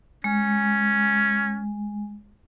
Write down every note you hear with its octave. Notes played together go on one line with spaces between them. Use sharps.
G#3 C#4